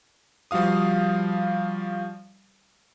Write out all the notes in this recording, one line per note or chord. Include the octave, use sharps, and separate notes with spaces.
F3 G3 F#4 F5 D#6